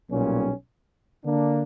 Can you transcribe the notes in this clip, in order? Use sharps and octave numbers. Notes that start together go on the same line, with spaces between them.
B1 A#2 G3 C#4
D3 A#3 D4